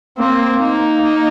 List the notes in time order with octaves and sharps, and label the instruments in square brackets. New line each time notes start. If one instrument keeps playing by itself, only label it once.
[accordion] A#3 [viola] C4
[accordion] A#3 [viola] D#4
[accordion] A#3